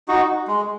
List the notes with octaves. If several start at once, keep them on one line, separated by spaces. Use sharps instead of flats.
D#4 F#4
G#3